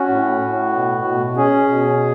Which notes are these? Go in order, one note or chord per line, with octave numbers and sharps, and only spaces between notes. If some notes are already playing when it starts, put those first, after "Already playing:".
Already playing: C#4 F#4
A2
A2
B2
B2
C#4 G#4
B2